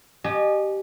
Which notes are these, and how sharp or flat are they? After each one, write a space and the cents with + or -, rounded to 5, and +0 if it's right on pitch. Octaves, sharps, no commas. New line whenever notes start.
G4 -10 D#5 -30 G#5 +20